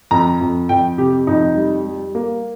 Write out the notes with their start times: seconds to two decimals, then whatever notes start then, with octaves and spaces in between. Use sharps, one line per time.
0.11 F2 A#5
0.41 F2
0.69 F2 G5
0.98 C3 G4
1.27 F2 D#4
1.56 G3
1.85 G3
2.15 A#3